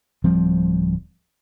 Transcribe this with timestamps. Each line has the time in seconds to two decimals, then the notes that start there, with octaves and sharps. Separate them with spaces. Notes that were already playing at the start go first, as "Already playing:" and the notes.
0.24 D1 F3 G3 C4